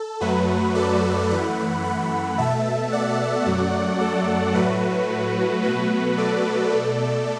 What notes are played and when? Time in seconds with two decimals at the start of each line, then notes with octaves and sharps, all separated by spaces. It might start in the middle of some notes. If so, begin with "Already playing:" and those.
Already playing: A4
0.20 F#2 F#3 A3 F#4 B4
0.75 A4 D5
1.29 F#2 E3 A3 F#5 B5
1.84 F#5 B5
2.38 B2 A3 E5 A5
2.92 D5 F#5
3.46 F#2 F#3 A3
4.00 A4 D5
4.54 A2 F#3 A3 F#4 B4
5.63 B2 F#3 A3 F#4 B4
6.17 A4 D5
6.72 B2 A3